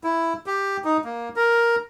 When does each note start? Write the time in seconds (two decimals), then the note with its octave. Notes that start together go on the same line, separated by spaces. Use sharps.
0.04 E4
0.46 G4
0.85 D#4
1.04 A#3
1.36 A#4